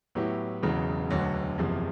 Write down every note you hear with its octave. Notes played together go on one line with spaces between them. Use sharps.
A2 F#3 B3 E4 G4
E1 E2 C#3 F#3
E1 D2 D3 F#3
F#1 E2 C3 F3 G#3